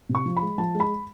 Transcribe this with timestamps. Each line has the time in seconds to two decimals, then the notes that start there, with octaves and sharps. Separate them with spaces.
0.09 C3
0.15 C#6
0.26 F3
0.37 B5
0.42 G#3
0.58 F3 A5
0.75 G#3
0.80 B5